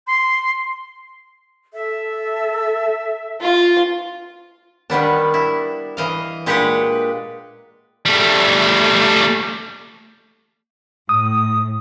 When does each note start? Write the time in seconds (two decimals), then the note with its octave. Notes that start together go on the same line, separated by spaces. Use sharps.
0.07 C6
1.73 A4 E5
3.41 F4
4.90 D#3 G3 B3 D4
5.34 E4
5.97 E3 D#5 F5
6.46 A#2 G#3 D4 G4 B4 F#5
8.06 G3 A3
11.09 A2 D#6